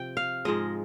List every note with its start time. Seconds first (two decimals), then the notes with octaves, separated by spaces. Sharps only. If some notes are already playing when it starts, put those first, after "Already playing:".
Already playing: C3 F3 G5
0.17 F5
0.45 G#2 F3 G#3 D#5